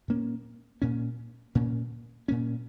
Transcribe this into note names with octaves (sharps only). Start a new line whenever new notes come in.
A#2 A#3 C#4
A#2 A#3 C#4
A#2 A#3 C#4
A#2 A#3 C#4